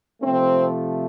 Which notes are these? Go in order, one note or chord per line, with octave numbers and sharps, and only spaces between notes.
C3 F3 A3 C4